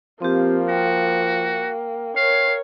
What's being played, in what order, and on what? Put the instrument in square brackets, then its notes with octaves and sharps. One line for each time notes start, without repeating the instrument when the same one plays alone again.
[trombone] F3 [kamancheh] A#3 [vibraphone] C4 G4
[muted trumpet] F#4 [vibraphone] G5
[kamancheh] A#4 C#5 [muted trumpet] F5